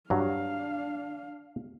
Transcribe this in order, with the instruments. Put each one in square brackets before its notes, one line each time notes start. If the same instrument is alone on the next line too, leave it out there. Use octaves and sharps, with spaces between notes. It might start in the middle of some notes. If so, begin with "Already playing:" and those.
[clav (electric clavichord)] G2 F#3 [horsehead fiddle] D4 F5